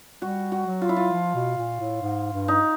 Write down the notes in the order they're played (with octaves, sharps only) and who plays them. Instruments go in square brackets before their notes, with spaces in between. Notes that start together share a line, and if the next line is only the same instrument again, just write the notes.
[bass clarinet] G3 [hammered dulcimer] F#4
[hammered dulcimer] F#4
[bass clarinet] F#3
[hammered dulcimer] F4
E4
F4
[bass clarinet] F3
B2
A#2
A2
G#2
G2
[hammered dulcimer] D#4